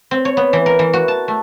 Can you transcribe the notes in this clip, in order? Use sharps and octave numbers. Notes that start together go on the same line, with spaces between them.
C4
C#5
B3
E3
A#4
E3
F#4
A5
A3